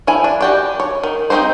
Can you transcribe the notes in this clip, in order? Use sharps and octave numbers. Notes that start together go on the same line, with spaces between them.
F3 E4 G#5
D4
F#4 G4 D5
C#5
D#3
C4 C#4 D#4 G4 C5